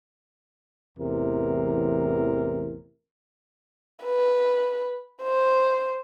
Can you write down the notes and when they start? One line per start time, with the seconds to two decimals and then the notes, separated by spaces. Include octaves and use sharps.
0.98 A1 E2 C3 A#4
4.04 B4
5.23 C5